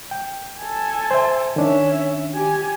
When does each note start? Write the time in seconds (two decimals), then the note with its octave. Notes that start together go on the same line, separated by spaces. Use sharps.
0.11 G5
0.60 A4 G#5
1.11 C5 E5
1.56 D#3 C#4 D4 E5
2.33 G4 G#5